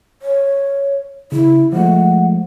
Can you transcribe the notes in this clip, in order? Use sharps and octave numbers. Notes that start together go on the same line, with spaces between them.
C#5
C#3 E4
F3 G#3 A3 F#5